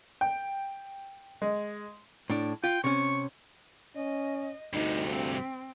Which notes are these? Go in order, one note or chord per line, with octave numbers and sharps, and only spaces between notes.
G5
G#3
A2 D4
F4 G5
C3 C#4 C#6
C#4 D#5
D2 G2 C3 D#4
C4